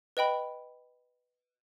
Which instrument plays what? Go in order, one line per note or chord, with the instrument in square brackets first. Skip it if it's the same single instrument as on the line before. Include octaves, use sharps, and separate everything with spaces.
[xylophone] B4 D#5 G5 B5